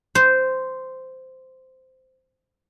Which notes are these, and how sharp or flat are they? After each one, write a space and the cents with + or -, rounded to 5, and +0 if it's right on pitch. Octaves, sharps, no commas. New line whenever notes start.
C5 -10